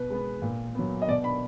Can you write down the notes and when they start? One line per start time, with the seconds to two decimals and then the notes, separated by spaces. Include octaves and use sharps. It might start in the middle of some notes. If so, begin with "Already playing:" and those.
Already playing: B2 B4
0.10 G#3 B3
0.42 A#2
0.75 F#3 B3
1.02 D#5
1.08 B2 D5
1.24 B5